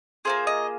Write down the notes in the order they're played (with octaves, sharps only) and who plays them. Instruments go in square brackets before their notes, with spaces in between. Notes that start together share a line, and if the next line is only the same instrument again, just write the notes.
[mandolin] A#3 F4 G#4 C5
D#5